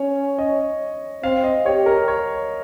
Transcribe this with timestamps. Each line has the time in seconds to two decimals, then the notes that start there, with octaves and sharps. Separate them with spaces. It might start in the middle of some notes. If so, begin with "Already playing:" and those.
Already playing: C#4 C#5
0.38 D#5
1.23 C4 F5
1.44 D#5
1.65 G4 C#5
1.86 A#4
2.08 C#5